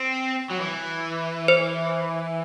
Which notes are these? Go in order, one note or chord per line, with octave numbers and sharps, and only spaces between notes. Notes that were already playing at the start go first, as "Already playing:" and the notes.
Already playing: C4
F#3
E3
C5